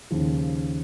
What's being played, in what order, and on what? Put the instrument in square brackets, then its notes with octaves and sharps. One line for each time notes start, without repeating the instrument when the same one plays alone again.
[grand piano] D#2 C#3 F3